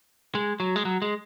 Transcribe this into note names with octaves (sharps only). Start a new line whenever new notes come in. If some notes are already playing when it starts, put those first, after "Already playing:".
G#3
F#3
G#3
F#3
G#3